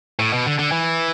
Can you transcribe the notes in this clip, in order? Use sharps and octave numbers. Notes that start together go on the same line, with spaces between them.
A2
B2
D3
D3
E3